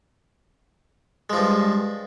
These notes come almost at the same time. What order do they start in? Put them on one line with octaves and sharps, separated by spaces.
G#3 F3 G2